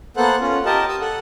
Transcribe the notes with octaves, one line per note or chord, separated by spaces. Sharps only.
A#3 B3 A4 C5 F#5 F#6
C#4 F4
G4 A#4 D#5 A5
D#6 E6
A4 F#5